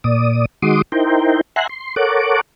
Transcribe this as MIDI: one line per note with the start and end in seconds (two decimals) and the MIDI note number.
0.04 0.45 46
0.04 0.45 74
0.04 0.45 87
0.62 0.82 51
0.62 0.82 56
0.62 0.82 66
0.62 0.82 84
0.62 0.82 86
0.62 0.82 87
0.92 1.41 63
0.92 1.41 64
0.92 1.41 70
0.92 1.41 72
0.92 1.41 79
1.56 1.67 76
1.56 1.67 78
1.56 1.67 80
1.56 1.67 82
1.56 1.67 84
1.56 1.67 90
1.69 1.95 84
1.96 2.41 69
1.96 2.41 70
1.96 2.41 73
1.96 2.41 78
1.96 2.41 86